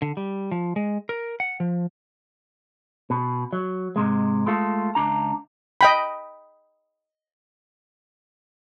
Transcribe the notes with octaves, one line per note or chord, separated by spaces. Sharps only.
D3
G3
F3
G#3
A#4
F#5
F3
B2
F#3
G#2 C3 G#3
G#3 A3 F4 A4
C#2 D4 A#5
D#5 G5 B5